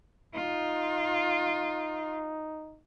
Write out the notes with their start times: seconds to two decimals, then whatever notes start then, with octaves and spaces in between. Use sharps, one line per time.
0.35 D#4 F4